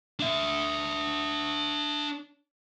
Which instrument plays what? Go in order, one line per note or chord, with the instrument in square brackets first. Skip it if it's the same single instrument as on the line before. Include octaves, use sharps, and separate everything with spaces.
[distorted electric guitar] D4 E5